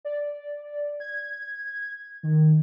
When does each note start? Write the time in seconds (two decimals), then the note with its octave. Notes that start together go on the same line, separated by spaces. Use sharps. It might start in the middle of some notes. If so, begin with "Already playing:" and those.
0.05 D5
1.00 G#6
2.23 D#3